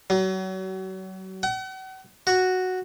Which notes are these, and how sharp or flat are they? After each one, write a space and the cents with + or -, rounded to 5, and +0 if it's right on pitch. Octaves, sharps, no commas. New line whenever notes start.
F#3 +35
F#5 +40
F#4 +0